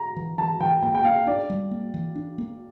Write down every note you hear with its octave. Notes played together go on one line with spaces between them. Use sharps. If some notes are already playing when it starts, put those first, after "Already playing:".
Already playing: A#5
E3
E3 A5
E3 G5
A#3 G5
G5
A#3 F5
D4 D5
G3
A#3
E3
D4
A#3